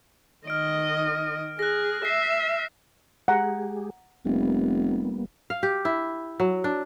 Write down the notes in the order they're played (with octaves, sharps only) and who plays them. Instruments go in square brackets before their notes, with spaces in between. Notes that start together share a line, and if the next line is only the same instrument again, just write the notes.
[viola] D#3 D#5 [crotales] F6 D7
[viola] G#4 [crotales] F#6 A#6
[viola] E5 [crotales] C7
[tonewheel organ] G#3 G4 G#4 [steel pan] F#5 A#5
[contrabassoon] F1 [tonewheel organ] G3 A#3 B3
[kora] F5
G4
E4
F#3
D4